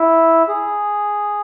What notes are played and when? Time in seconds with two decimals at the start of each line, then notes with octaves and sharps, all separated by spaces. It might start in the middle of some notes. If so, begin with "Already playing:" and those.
Already playing: E4
0.48 G#4